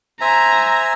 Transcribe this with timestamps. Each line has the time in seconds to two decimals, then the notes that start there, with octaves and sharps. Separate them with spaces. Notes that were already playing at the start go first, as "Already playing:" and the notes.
0.21 C5 E5 G#5 A#5